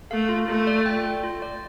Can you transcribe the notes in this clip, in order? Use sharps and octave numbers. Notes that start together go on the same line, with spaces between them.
A3 F5
F4
A3 F4
D5
G5
F4
F4
D5